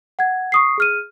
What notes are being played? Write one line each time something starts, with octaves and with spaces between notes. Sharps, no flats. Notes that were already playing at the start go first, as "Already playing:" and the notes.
F#5 G#6
C#6 D#6 C7
G#4 F6 D#7